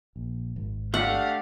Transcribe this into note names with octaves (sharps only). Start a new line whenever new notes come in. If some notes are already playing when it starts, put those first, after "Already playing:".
A#1
G#1
A3 D4 G4 F5 F#5